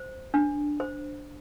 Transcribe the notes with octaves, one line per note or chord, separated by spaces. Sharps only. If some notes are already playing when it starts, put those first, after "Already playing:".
Already playing: C5
D4
C5